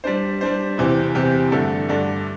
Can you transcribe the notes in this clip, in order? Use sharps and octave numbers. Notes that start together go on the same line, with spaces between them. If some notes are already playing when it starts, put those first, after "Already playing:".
G3 D4 C5
G3 D4 C5
E2 C3 E3 C4 G4
E2 C3 E3 C4 G4
G2 D3 A3 D4 A4
G2 D3 A3 D4 A4